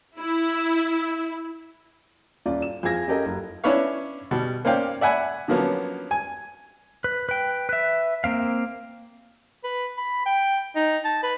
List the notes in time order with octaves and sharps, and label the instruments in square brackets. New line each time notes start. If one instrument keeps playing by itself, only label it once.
[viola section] E4
[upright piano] D#1 C#4 F4 D5
E7
F2 F3 G#4 F5 G#6 A#6
C#4 F4 G4 A4 A#4 D#5
F#1
[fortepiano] C#4 D4 E4 B4 C#5 F5
B2 G3
A#3 C#4 C5 D5 F5 G5
D5 E5 F#5 G#5 B5
D3 F3 F#3 A#3 B3 C#4
G#5
[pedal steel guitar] B4
B4 G5
B4 E5
A#3 C4 F5
[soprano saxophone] B4
B5
G5
D#4
A5
B4